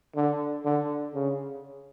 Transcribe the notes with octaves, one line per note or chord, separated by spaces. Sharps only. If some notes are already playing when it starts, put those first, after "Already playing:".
D3
D3
C#3